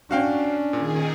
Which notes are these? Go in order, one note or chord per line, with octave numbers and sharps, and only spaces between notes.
C#4 D4 F#4 F5 G5
A#2 D#3 G#4